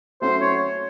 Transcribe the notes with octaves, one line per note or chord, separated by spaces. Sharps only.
F#3 A3 C#4 F#4 C5
C#5